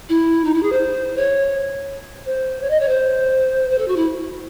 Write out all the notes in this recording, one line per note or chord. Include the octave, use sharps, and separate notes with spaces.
E4
D#4
E4
G#4
C5
C#5
C5
C#5
D#5
C#5
C5
C5
A4
F#4
E4